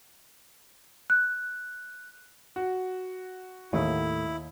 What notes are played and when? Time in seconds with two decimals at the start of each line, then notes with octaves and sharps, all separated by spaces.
1.10 F#6
2.56 F#4
3.73 D#2 A2 A3 E4